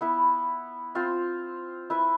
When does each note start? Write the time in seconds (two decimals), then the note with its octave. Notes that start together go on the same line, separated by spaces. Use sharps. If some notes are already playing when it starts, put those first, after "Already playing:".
0.01 B3 E4 B4
0.95 C4 F4 C5
1.90 E4 B4 E5